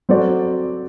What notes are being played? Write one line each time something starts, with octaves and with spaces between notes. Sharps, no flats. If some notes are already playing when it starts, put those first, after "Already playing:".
F#3 C4 F#4 A4 D5